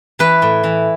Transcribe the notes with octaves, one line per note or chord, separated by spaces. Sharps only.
E3 B4
A2
E3